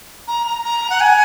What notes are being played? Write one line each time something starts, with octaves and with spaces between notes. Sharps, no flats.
A#5
A#5
A#5
F#5
G#5